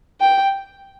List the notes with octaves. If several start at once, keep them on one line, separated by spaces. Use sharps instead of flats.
G5